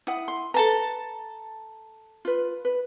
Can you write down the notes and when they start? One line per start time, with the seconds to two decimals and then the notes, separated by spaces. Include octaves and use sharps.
0.07 E4 F#5 D#6
0.28 C6
0.54 A4 B4 A5 A#5
2.25 F4 B4
2.65 B4